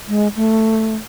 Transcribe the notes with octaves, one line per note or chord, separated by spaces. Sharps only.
G#3
A3